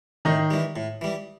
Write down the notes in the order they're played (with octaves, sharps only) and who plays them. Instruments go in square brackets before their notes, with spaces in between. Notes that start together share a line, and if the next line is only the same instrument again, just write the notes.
[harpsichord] A2 [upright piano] D#3 D#4
[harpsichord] E3 G3
A2
E3 G3